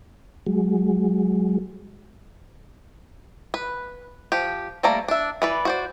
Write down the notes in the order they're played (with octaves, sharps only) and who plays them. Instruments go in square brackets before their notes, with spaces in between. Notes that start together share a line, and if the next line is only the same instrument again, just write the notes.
[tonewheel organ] F#3 G#3
[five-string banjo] B4
F3 G4
G3 A3 A#3 D5 A#5
D4 E5
E3 B4 D5
F#4 C5 D5